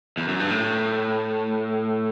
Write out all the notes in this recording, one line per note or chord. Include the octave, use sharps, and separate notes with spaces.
E2
F#2
G2
A2